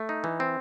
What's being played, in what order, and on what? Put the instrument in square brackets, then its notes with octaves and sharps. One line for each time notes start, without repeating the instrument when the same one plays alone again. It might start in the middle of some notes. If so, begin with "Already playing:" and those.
Already playing: [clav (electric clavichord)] A3
D#4
E3
C4